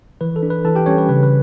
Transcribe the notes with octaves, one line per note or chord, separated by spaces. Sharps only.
E3 B4
A4
D4
B4
E3 A4 A5
G4 G5
G3 C#4 C#5
B4
C#3 B4
B4